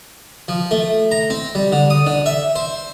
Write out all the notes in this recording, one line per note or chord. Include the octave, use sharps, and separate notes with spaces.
F3
A3
A#5
C4
G3
D3
D#6
D3
E5
C5